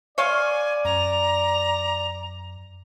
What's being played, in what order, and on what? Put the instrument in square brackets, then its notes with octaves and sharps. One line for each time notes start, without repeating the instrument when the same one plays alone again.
[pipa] C#5 F5 C6 [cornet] D5 [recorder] G#5
[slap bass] F#2 [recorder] A#5